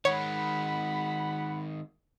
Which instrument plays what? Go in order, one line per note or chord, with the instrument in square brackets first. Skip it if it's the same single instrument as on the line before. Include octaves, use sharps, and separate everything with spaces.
[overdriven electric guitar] D#3 G#3 [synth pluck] C#5 [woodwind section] F#5 B5